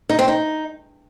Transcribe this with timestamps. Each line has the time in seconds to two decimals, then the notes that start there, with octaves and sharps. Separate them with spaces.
0.09 D#4
0.19 C4
0.28 D#4